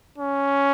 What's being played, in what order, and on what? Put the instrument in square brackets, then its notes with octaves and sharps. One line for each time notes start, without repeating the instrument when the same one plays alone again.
[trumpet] C#4